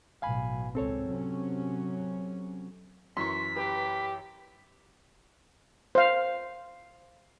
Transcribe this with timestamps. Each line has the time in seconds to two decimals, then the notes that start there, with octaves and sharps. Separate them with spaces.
0.22 A1 B2 F#3 F5 G#5 B5
0.75 G#1 C#2 G#2 C4 A4 C#5
1.09 C3 F#3 C#4
3.17 F#2 E3 C6 C#6 B6
3.56 G4 B4
5.95 C5 F5